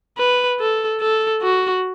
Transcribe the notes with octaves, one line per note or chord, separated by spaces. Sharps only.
B4
A4
A4
F#4